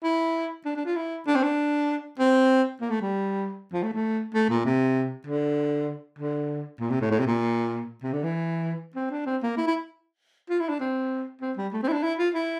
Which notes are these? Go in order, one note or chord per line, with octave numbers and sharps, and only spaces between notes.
E4
D4
D4
F4
E4
D4
C4
D4
C4
A#3
A3
G3
F3
A3
A3
A3
A#2
C3
D3
D3
A#2
C3
A2
A2
C3
A#2
C3
D3
E3
C4
D4
C4
A#3
E4
E4
F4
E4
D4
C4
C4
G3
A3
C4
E4
D4
E4
F4
E4